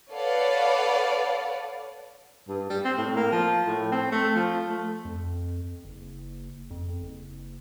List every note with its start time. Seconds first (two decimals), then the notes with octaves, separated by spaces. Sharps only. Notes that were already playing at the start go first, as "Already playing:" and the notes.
0.12 A4 B4 C#5 D5 F5 F#5
2.48 G2
2.70 G3
2.85 C4
2.98 A2
3.16 A#3
3.32 F3
3.67 A2
3.92 C4
4.12 A3
4.36 F3
4.69 A3
5.05 F2
5.85 F#1
6.70 F2
7.02 F#1